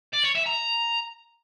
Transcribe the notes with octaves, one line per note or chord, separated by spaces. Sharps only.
D5
C#5
E5
A#5